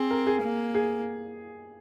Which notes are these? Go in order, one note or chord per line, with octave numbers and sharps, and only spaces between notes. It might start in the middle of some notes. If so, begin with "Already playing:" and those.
Already playing: C4 G#4
A#4
G#4
A#3
G#4